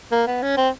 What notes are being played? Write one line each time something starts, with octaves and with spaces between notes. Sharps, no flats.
A#3
B3
C#4
C4